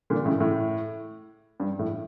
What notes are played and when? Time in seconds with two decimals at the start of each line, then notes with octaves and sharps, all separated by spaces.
0.10 A#2 D3
0.25 A2 C#3
0.40 A2
1.60 G2
1.79 A2